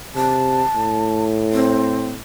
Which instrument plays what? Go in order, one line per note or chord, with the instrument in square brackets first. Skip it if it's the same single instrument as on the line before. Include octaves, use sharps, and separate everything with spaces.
[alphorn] C3 [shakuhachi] A5
[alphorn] A2
[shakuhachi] C4